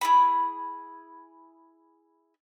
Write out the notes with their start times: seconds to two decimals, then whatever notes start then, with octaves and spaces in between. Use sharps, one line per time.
0.01 E4 G#4 B5